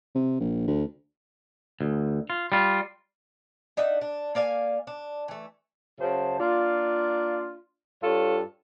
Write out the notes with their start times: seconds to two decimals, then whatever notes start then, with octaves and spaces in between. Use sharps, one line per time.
0.15 C3
0.40 A#1
0.68 D2
1.81 D2
2.30 F4
2.52 G3 F4
3.77 D4 D#4 E5 F#5
4.01 D4
4.35 A#3 D5 F5 G#5
4.87 D4
5.28 E3 A3
6.00 F#2 C#3 C5 A5
6.40 A#3 D4 F4
8.03 G2 F4 A4 C#5